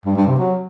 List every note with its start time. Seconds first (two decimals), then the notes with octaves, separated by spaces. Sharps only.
0.05 G2
0.16 G2
0.27 C3
0.37 F#3